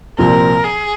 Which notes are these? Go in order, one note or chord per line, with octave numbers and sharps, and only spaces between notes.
C2 A#2 F3 C4 A#4
G#4